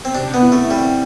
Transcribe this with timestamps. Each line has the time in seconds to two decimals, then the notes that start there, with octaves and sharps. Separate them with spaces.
0.05 C4
0.15 C3 D4
0.34 B3
0.42 E4
0.52 A3
0.70 G3 C4